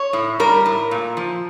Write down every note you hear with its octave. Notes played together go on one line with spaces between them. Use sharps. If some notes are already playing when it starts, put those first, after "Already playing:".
Already playing: C#5
A2
G3 A#4
A2
A#2
F3